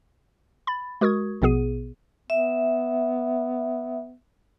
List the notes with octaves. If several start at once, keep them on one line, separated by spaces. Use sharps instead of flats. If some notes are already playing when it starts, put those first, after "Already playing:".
B5 A6
G#3 F#4 A#4 C#6 D#6 G#6
A#1 B2 B3 G#4 D#7
B3 E5